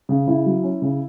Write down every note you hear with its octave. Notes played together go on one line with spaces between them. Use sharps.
C#3
C#3 E4
F#3
C#4
C#3